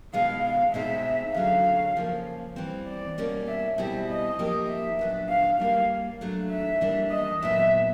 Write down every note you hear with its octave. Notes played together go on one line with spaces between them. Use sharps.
B2 G#3 B3 F5
F5
B2 G#3 C4 D#4 G#4 E5
D3 F#3 A3 C#4 F#4 F5
C#3 F3 A#3 C#4
E3 G3 C4
D5
B2 G3 A#3 C#4
E5
B2 G3 C4 E4 G#4 E5
D#5
F3 A#3 D#4 G4
E5
A#2 F#3 B3 D4
F5
G3 A#3 C#4 F5
F#3 A3 D4
E5
E3 G3 A#3 D4
D#5
A#2 F#3 B3 E5